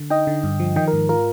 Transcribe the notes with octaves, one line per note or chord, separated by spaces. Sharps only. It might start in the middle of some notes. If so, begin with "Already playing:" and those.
Already playing: D3
D#4 D#5 G5
D3
G2
F3
D#3 D#5 G5
A#4
G#2
F4 A#4